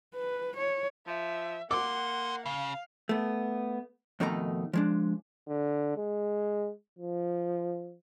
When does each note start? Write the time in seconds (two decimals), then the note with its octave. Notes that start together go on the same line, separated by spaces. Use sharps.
0.15 B4
0.57 C#5
1.07 F3 E5
1.71 A#3 A4 F#5 C6 D6
2.46 C#3 F5
3.09 A3 B3
4.20 F2 B2 D#3 A3 D#4 A#5
4.73 F3 G#3 D4
5.47 D3
5.97 G#3
6.99 F3